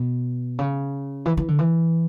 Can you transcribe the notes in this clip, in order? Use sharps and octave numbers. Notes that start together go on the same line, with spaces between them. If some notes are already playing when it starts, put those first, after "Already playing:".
Already playing: B2
C#3
E3
E3
D3
E3